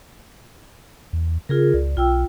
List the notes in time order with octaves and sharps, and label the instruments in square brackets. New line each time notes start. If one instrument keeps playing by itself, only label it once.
[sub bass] E2
[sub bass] C#3 [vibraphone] F4 G#4 A#4
[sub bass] C#2 [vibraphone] D5
[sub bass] B1 [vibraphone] F4 G5 E6